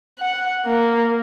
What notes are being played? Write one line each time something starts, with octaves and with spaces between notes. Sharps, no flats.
F#5
A#3